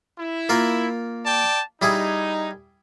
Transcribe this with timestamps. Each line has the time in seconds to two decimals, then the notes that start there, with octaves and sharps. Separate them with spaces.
0.19 E4
0.49 A#3 F4 A#4
1.25 D5 G5 A5
1.82 G3 D#4 E4 G#4